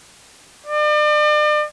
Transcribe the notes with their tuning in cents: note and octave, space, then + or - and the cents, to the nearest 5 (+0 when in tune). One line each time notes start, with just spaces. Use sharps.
D5 +40